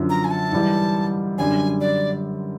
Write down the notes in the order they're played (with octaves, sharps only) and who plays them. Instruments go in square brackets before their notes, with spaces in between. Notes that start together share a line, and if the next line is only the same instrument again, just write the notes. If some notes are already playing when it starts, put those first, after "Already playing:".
Already playing: [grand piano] F#2 D3 F3
[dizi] A#5
G#5
A5
[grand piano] G#2 E3 G3
[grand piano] F#2 D3 G3 [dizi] G#5
[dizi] D5